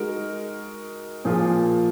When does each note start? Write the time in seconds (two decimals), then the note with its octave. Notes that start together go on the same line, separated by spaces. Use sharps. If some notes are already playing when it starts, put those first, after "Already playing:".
Already playing: G#3 D#4 F#4 A#4
1.25 A#2 F3 A#3 F4 G#4